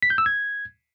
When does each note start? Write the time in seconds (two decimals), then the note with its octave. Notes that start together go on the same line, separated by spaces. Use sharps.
0.02 B6
0.10 G6
0.18 E6
0.26 G#6